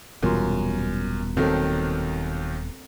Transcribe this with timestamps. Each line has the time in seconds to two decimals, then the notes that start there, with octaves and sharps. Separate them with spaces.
0.23 D#1 F#2 B2 E3 G3 F4 A#4 C6
1.37 D#2 D#3 F#3 C4 A4